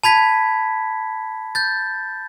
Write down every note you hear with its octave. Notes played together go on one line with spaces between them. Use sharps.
A5 B5 G#6 B6
G6 A6